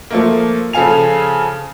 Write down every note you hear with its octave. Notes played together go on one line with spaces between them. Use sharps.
F3 A3 A#3
C#3 F3 A4 F5 G#5 F7